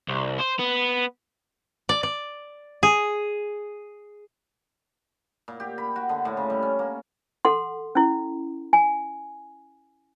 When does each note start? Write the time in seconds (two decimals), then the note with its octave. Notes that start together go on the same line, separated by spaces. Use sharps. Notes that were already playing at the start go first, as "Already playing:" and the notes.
0.09 C2
0.39 C5
0.59 B3
1.89 D5
2.03 D5
2.83 G#4
5.48 A#2
5.60 G4
5.78 B5
5.96 F#4
6.09 D3
6.25 A2
6.37 C#3
6.50 G3
6.63 C#4
6.79 A#3
7.45 A4 F#5 C6
7.95 C#4 E4
8.73 G#5